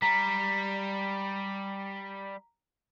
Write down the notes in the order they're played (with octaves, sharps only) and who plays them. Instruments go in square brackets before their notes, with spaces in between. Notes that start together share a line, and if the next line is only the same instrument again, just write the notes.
[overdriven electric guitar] G3 [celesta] A#5 B6